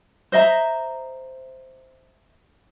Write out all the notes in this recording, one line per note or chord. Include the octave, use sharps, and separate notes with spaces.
C5 D#5 E5 A#5